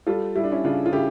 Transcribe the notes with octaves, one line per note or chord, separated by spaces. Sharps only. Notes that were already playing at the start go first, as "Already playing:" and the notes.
G3 F4 A4
G3 E4
D4
C#4 E4
C#3 D4 F4
F4
C#3 E4 G4